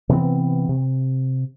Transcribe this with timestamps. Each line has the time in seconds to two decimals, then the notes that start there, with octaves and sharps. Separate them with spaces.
0.09 C3 E3 B3 C4
0.69 C3